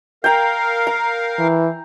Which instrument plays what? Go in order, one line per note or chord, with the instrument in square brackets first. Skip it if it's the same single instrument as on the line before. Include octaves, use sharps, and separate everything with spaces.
[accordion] A#4 F5 [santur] G5 A#5
[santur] A#5
[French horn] E3